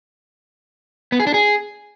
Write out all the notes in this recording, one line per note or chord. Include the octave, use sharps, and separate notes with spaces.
B3
G#4
D4
G#4